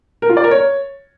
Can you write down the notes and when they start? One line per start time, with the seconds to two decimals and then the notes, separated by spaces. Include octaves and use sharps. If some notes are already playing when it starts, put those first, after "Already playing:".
0.22 A#4
0.30 F4
0.37 D5
0.44 A#4
0.51 C#5